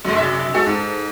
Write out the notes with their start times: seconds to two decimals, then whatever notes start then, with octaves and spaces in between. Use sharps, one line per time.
0.05 F#2 D3 G#3
0.16 C3 E5
0.54 G#3 F#4 G#4 A4
0.66 G#2